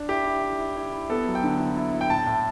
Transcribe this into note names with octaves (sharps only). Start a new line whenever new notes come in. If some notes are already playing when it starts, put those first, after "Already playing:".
Already playing: D4
E4 G4
E4
E4
E4
E4
E4
B3 A4
F#3
G5
D3
E4
E4
E4
G5
A2 A5
A2